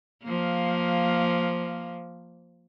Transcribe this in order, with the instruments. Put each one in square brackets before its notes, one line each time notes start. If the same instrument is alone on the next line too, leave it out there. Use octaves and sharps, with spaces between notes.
[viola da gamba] F3 A#3